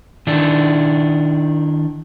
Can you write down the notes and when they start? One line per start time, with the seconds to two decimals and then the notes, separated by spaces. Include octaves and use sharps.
0.27 D#3 D4 E4